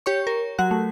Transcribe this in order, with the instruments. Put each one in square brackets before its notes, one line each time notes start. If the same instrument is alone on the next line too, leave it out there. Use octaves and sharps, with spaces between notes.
[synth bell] G4 C#5 C#6
A#4
F#3 F#4 F#6
A3